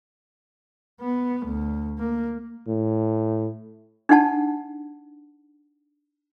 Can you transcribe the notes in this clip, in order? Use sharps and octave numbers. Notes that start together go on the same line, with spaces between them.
B3
D2
A#3
A2
D4 D#4 F#5 A5